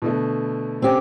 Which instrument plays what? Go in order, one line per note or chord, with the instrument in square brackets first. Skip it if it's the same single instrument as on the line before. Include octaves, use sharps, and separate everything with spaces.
[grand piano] B2 D3 A3
[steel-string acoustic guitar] C4 C#4 G4